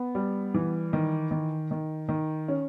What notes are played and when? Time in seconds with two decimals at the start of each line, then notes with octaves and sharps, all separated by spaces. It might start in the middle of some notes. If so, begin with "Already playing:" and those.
Already playing: B3
0.15 G3
0.54 E3
0.93 D#3
1.31 D#3
1.71 D#3
2.09 D#3
2.48 C#4